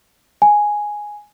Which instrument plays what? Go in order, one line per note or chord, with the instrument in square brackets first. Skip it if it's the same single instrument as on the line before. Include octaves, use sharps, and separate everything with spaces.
[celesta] G#5